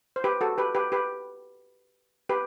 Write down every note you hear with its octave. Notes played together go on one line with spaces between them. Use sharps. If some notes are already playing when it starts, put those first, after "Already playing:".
C5
G4 B4
F#4 A4
G4 B4
G4 B4
G4 B4
G4 B4